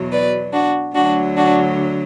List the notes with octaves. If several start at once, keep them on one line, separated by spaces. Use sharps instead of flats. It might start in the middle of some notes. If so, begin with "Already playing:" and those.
Already playing: E2 B2 F#3
B4 D5
D4 F#4
D2 D3 F#3 D4 F#4
D4 F#4